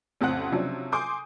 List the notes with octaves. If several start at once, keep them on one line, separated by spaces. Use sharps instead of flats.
A1 F2 C#3 C4 F#5 F#6
C3 F3 F#3 C#4 D4
G#5 C6 D6 D#6 G6